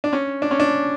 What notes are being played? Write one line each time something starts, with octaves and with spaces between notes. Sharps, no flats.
D4
C#4
D4
C#4
D4